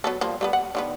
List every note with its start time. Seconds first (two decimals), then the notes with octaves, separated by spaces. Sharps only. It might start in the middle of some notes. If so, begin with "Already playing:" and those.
0.04 F#3 B3 A4
0.21 F3 G3 A#3
0.41 G3 A#3 B3
0.53 F#5
0.75 D3 D#3 B3